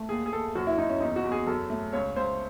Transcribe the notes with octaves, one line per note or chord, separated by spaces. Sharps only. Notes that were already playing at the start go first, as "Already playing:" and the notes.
Already playing: A3
D#2 G#4
G#4
D#2 A4
F#2 F#4
E4
F#2 D#4
C#4
E2 D#4
F#4
E2
G#4
F#2 A4
A3
C#2 C#5
C#2 C5